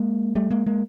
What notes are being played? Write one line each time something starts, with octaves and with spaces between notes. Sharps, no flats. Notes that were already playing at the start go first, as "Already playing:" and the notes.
Already playing: G#3 A#3
G3 A3
G#3 A#3
G#3 A#3